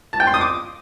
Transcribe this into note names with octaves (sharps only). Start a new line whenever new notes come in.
A5
G5
C6
D#6
D6